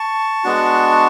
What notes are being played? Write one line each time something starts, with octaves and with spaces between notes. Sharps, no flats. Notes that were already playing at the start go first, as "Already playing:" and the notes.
Already playing: A5 C#6
G#3 B3 D4 F#4